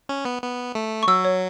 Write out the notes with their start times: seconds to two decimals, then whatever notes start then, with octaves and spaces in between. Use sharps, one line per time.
0.09 C#4
0.25 B3
0.43 B3
0.75 A3
1.03 C#6
1.08 F#3 E6
1.25 C#5